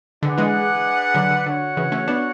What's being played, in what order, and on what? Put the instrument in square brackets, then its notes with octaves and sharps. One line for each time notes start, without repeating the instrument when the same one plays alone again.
[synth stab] D3 [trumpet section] D4 G#4 B4 D5 F#5
[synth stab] E3 G#3
D3 F#3
D3
[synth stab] D3 [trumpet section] F#4 C#5 F#5
[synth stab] C#3 E3
A3 C#4
B3 D4